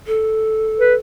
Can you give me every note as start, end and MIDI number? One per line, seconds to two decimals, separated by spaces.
0.07 0.96 69
0.80 0.95 71